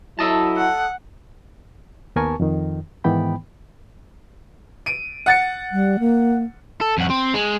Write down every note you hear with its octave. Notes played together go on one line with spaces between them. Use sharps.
F#3 E4 A4 D#5 A5
F#5
D#2 B3 A#4 G#5 A5 C#6
F2 D#3
G#2 D#3 E3 B3 G5 B5
D7 D#7
F#5 A6 C#7
G3
A#3
A4
F2 F#4
C4
G#3